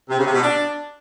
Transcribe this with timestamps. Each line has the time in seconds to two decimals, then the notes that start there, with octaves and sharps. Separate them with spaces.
0.10 C3
0.18 C#3
0.26 C3
0.35 B2
0.43 D4